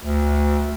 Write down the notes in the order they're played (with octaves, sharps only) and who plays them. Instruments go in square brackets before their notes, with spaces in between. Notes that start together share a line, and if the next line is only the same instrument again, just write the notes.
[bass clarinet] D2